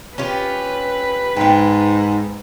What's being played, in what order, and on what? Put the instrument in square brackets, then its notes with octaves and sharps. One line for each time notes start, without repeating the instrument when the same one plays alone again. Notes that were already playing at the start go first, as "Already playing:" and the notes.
[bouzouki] C#4 F4 G4 [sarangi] B4
[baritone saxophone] G#2 [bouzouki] B3 G5